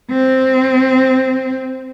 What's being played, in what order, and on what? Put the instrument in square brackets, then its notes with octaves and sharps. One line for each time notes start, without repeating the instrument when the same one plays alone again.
[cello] C4